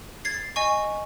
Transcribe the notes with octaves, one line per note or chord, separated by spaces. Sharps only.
G#6 A6 C7
D#5 G#5 C#6